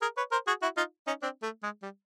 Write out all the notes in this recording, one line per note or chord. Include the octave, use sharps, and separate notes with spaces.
G#4 A#4
B4 C#5
A#4 C5
F#4 G#4
E4 F#4
D#4 F4
C#4 D#4
C4 D4
A3
G#3
G3